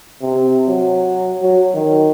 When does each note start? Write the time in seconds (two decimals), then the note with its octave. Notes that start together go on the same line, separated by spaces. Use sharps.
0.21 C3
0.68 F#3
1.41 F#3
1.74 D#3